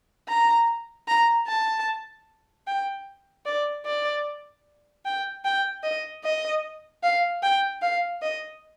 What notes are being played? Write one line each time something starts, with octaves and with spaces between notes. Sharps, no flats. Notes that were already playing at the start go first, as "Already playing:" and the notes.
A#5
A#5
A5
G5
D5
D5
G5
G5
D#5
D#5
F5
G5
F5
D#5